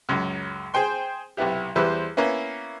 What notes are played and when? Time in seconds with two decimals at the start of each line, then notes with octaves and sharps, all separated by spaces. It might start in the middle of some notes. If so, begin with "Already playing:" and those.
0.09 C#2 F#2
0.74 G#4 C5 G5 C6
1.37 B1 C3 B3 E4 G4
1.76 E2 G3 E4 B4 C5 E6
2.17 A#3 B3 C#4 E4